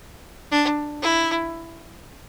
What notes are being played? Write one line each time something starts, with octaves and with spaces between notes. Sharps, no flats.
D4
E4